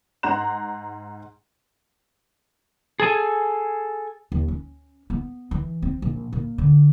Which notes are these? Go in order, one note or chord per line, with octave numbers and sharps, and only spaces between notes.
G#2 F#5 A#5 C6 F#6 E7
G#4 A4 G#5
D#2
C#4
B3
E3
C4
A#1
A#2
D3